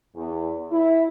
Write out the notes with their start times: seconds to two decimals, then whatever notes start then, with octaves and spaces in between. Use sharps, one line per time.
0.16 E2
0.71 E4